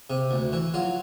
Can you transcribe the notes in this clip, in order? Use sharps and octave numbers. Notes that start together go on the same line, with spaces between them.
C3
D2
E3
F#3 F4